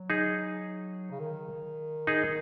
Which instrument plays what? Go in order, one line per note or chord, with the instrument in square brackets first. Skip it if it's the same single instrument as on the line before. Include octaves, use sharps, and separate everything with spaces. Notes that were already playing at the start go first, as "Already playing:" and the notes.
Already playing: [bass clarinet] F#3
[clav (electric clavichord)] D#4 G#4
[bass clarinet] C#3
D#3
[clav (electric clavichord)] D#4 G#4